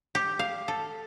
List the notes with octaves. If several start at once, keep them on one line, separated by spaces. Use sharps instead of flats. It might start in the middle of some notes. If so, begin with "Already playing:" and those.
G4
F5
A4